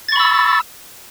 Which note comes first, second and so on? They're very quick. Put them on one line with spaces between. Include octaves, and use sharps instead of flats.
A6 C#6 B5 E6